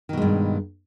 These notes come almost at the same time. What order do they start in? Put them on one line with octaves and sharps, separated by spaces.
D#3 B2 G#3 G2